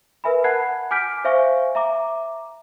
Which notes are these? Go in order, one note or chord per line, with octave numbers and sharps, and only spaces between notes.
A#4 B4 E5 G#5 B5
F#5 A5 B5 F#6 G#6 C7
G#5 D6 F6 G6 B6 D7
C5 E5 F5 G#5 C#6
E5 A#5 D6